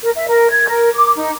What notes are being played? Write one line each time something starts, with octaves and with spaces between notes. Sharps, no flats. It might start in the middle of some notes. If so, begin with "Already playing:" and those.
A#4
E5
A#4
G#6
A#4
D6
D#4